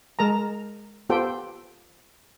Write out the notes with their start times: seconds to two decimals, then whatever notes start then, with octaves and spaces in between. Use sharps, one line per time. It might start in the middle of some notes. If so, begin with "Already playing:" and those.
0.19 G#3 A#4 A5 A#5
1.09 B3 F4 G4 A4 C5 G5